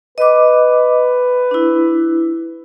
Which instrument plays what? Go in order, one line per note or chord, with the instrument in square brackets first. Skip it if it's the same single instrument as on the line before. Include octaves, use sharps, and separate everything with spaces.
[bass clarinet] B4 [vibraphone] D#5 D6
[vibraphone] D4 E4